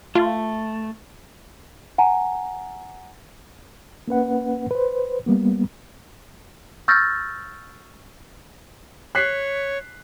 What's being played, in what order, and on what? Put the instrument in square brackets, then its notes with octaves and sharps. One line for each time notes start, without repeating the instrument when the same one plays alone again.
[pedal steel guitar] A3 [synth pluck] F4
[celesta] F#5 G#5 A#5
[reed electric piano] A#3 C#4 B4 F#5
B4 C5
G3 A#3 B3
[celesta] C#6 E6 F6 G6 A6 A#6
[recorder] C#5 [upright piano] F#6 B6 C7